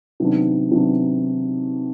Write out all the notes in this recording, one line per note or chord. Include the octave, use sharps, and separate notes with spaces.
C3 D#3 F#3 B3 D4
C3 D#3 F#3 B3 D4